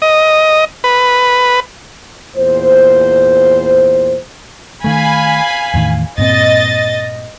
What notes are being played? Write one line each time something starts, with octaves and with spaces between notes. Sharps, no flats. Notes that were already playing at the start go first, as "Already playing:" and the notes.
D#5
B4
E2 A#2 C5
D#3 A3 F5 G#5 B5
E2 A2 D#3
G2 A#2 C4 D#5 A6